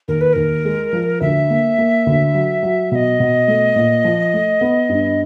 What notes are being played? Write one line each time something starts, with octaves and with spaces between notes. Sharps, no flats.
D#2 A#4
B4
D#2 A#4
G#3
F3
D2 E5
A#3
A#3
D2
F#3
F#3
B2 D#5 E5
B2
A3
A#2
F3
A3
B3
G2